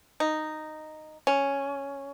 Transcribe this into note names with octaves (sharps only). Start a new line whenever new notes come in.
D#4
C#4